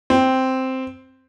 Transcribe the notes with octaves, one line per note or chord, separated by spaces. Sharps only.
C4